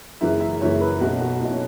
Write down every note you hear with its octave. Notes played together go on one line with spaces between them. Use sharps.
F#1 F#2 C#3 E3 E5
E5
F#1 F#2 C#3 E3 C#5
B4
B1 B2 F#4
F#4
B1 B2 E4
C#4